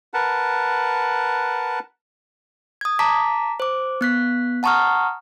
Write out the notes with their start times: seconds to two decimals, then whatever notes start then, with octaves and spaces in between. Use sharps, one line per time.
0.14 A#4 B4 F#5 A5
2.81 D#6 G#6
2.99 A5 A#5 D6 B6
3.60 C5 D6
4.01 B3 F#6 B6
4.63 F#5 A5 A#5 C#6 D#6 F6